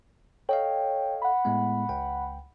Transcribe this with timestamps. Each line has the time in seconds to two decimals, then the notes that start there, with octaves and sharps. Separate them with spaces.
0.49 A4 C#5 D#5 F5 G5
1.22 F#5 B5
1.45 A2 G#3 B3
1.89 C#2 G5